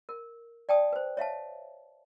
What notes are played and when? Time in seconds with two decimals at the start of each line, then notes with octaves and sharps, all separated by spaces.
0.09 A#4
0.69 D5 G5 A5 D#6
0.93 B4 C5
1.17 C#5 E5 F5 A5